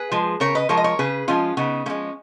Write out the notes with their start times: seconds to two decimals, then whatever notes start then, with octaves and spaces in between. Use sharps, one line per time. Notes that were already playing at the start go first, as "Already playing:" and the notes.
Already playing: G#4 B4
0.11 F3 G#3
0.40 C#3 A#4 C#5
0.55 B4 D#5
0.69 F3 G#3 A#4 C#5
0.77 D#5
0.84 A#4 C#5
0.99 C#3 G#4 B4
1.28 F3 G#3 C#4 F4
1.57 C#3 B3 D#4
1.86 F3 G#3 A#3 C#4